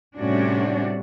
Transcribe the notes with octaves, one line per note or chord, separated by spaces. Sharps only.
A2 C3 G3 C#4 D4 F#4